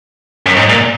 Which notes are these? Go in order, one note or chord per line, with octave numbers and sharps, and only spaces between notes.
F#2
G#2
A#2